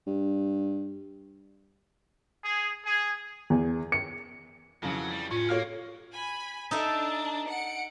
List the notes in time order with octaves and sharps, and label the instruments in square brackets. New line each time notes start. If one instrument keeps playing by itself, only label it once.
[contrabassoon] G2
[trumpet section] G#4
G#4
[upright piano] E2
C#7
[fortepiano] F2 C#3 E3 [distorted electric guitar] F#3
[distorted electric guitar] G3
[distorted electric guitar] C#2 C#4 [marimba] A2 [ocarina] F4
[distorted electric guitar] A#3 [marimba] F#4 G4 A4 [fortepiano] C#5 F5 F6
[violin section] G#5 B5
[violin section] D4 A5 [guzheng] D#4 A4 E5
[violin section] F#5 C#7 D7